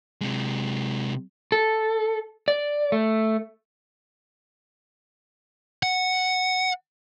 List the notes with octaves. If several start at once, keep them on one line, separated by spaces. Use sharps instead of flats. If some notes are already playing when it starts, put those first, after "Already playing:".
C3 G#3
A4
D5
A3
F#5